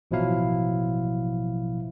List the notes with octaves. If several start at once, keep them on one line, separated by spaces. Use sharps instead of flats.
A1 B2 F3 F#3 E4 F5